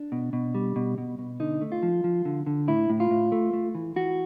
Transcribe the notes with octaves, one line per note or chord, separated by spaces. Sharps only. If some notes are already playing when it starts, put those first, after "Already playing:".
Already playing: D4
B2
B2
G3
B2
B2
B2
D3 D#4
A3
F4
F3
F3
D3
D3
A2 E4
A2
F4
A2
A3
A3
E3
E3 F#4